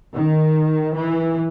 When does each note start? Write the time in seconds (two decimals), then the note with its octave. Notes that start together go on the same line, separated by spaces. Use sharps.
0.14 D#3
0.94 E3